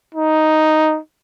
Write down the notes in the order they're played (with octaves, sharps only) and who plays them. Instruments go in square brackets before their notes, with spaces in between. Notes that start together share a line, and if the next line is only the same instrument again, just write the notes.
[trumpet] D#4